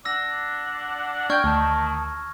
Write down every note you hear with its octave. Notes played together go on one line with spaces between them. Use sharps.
D4 F#5 E6 A#6
D4 G5 C#6 F6 G#6
D2 D#3 A5